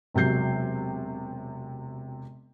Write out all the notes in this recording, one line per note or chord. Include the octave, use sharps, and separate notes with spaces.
E1 C3 F#3 G6 C7